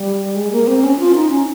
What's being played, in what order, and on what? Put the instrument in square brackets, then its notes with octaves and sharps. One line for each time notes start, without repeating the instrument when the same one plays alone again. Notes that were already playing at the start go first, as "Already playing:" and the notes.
Already playing: [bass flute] G3
G#3
A#3
C4
C#4
F4
D#4
C#4